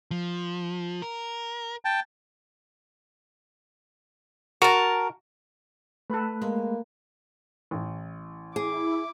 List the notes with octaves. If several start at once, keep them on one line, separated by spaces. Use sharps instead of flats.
F3
A#4
G5 A5
F#4 A#4 A5
A3 A4 B4 B5 F#6
G#3 A#3
A1
E4 G#4 D6